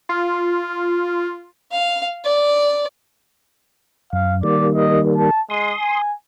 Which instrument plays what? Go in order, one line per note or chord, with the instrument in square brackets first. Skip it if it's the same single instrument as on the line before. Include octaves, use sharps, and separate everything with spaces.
[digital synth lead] F4
[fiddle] F5
D5
[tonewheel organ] F#2 [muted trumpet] F5
[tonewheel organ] D#3 G3 A#3 [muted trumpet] D5
[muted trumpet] D#5
A5
[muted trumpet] G#3 [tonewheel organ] C6 D#6
[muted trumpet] G#5